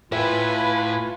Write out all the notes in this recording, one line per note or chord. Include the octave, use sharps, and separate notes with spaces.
A2 F4 B4 E5 G#5